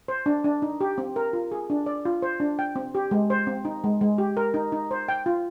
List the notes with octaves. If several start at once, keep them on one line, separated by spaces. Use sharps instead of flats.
C5
D4
D4
D#4
G4
C4
A#4
F4
G#4
D4
D5
F4
C5
D4
G5
C4
G4
G#3
C5
C4
D#4
G#3
G#3
G4
A#4
D#4
D#4
C5
G5
F4